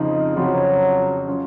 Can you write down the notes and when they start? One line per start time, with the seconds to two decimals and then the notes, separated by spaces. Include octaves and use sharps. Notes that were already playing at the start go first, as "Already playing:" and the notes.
Already playing: F2 C#3 F3 C4 D#4
0.36 F2 C#3 F3 F#3 C4
1.28 F#3 C#4 F4